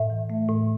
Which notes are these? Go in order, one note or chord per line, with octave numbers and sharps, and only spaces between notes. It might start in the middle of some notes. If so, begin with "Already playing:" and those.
Already playing: A2 E5
E3
A3
A2